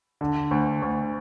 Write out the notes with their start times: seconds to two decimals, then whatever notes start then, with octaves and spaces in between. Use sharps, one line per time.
0.21 D3
0.51 D2
0.82 D2